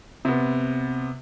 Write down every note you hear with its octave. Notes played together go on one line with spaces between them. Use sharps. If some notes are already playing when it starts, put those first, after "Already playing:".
C3 B3